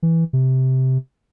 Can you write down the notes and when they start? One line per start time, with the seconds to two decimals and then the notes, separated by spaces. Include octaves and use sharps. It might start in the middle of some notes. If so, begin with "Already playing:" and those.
0.03 E3
0.33 C3